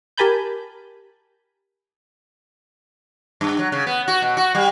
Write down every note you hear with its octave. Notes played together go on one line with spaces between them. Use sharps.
G4 A#4 G#5 A5 B5 G6
G2
F#3
C#3
B3
F#4
B2
F#4
G3